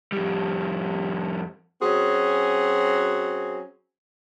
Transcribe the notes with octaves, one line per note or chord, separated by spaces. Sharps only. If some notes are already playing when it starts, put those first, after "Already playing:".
F2 G3
F#3 C4 C#4 F#4 G#4